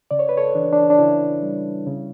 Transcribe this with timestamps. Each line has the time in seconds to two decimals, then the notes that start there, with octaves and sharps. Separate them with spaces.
0.11 C#3 D5
0.19 C#5
0.29 B4
0.37 A4 C#5
0.55 E3 D4
0.73 D4
0.90 D4
0.99 C#3 E4
1.43 G3
1.87 C#3